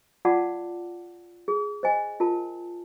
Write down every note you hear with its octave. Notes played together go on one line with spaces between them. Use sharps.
F4 D5 F5 F#5 A5 D6
G#4
C5 D#5 G#5
F4 A#4 A5